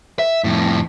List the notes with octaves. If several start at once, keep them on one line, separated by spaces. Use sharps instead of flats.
E5
F2 A2